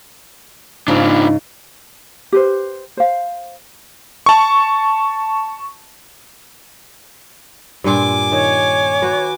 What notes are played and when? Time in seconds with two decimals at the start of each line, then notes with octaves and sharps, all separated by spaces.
0.88 G#2 C#3 D4 F4
2.32 G4 B4 C5
2.97 C5 F5
4.26 A5 C#6
7.84 G2 A#2 F4 G#5 D6
8.32 D#3 C#5
9.02 F#4 B4